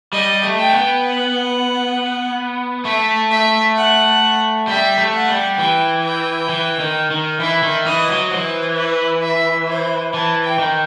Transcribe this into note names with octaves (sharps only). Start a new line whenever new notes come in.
G3 D#5
A3
G5
B3
F#5
A3 E5
E5
F#5
G3 E5
A3
F#5
G3
E3 G5
G5
E3
D#3
D#3
E3 E5
D#3
E3 D#5
F#3
E3 C5
B4
E5
C5
E3 A5
G5
D#3